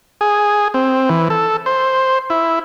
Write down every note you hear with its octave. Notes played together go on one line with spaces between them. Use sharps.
G#4
C4
E3
A4
C5
E4